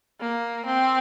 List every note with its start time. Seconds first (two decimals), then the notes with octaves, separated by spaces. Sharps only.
0.21 A#3
0.66 C4